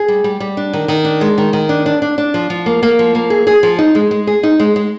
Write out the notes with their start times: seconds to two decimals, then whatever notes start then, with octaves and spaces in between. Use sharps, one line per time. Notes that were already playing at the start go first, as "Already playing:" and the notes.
Already playing: G#4
0.08 G3
0.24 G3
0.40 G3
0.57 D4
0.73 D#3
0.88 D#3
1.05 D4
1.21 G#3
1.38 D#3
1.53 D#3
1.69 D4
1.86 D4
2.02 D4
2.18 D4
2.34 F3
2.50 F3
2.66 A#3
2.83 A#3
2.99 F3
3.15 A#3
3.30 G#4
3.47 G#4
3.63 F3
3.79 D#4
3.95 G#3
4.11 G#3
4.27 G#4
4.43 D#4
4.60 G#3
4.76 G#3